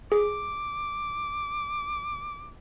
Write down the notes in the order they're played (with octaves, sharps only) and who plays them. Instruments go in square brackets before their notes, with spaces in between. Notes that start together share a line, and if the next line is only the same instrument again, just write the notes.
[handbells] G#4 [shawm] D6